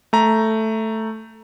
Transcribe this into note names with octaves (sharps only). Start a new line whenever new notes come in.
A3 A#5